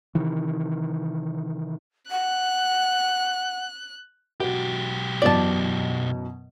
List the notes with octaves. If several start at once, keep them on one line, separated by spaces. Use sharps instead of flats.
C3 D#3 E3
F#5 F#6
B1 F#4 G4
F#2 B2 E3 D5 A5